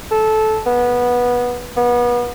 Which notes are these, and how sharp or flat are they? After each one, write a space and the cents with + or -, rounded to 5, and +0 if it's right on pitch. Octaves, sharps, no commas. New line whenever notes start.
A4 -15
B3 -15
B3 -30